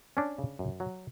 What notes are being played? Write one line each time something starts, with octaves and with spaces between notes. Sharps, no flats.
C#4 D4
C#3
F#2
F#3